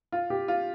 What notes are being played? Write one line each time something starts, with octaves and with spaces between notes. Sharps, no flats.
F4
G4
F4